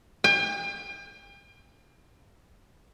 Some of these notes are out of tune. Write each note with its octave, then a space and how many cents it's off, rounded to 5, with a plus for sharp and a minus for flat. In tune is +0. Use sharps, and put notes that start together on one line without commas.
G5 +40